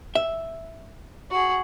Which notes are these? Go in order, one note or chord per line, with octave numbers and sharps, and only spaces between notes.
E5
F#4 G#4